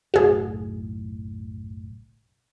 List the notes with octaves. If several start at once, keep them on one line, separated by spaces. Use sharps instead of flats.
F#1 B1 A2 F#4 G#4